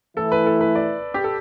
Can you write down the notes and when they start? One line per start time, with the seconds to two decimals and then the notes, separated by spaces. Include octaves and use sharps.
0.17 E3 A3 E4 A4
0.32 B4
0.47 A4
0.61 B4
0.75 D5
1.14 G4
1.24 A4